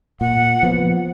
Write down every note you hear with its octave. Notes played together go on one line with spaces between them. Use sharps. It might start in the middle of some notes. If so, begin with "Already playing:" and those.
A#2 F#5
F3 B3